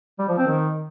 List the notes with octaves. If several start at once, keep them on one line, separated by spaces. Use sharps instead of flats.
G3
F3
C4
D#3